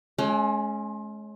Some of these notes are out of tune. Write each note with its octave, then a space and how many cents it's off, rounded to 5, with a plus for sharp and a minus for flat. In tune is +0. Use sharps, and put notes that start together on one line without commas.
G#3 +40 C#4 +0